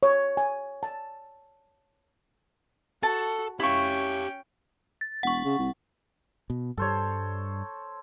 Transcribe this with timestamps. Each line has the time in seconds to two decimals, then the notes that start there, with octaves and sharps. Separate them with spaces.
0.03 C#5
0.37 G#5
0.83 A5
3.03 F#4 A4 A5
3.60 C#4 E4 G4 F5 G5 C#6
5.01 A6
5.23 E1 F#5 C#6
5.45 C#3
5.59 C2
6.50 B2
6.77 G2 G3 A4 C5 C#5